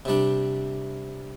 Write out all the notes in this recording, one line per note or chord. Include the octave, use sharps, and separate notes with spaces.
C3 G3 D4